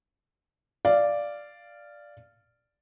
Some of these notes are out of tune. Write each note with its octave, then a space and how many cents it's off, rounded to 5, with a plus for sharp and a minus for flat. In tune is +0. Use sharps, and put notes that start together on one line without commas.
D5 +0 F5 -10